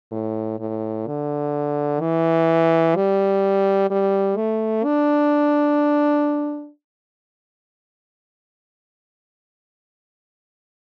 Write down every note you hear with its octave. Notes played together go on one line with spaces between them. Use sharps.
A2
A2
D3
E3
G3
G3
A3
D4